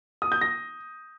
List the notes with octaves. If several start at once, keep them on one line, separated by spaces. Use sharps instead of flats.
D#6
G6
A#6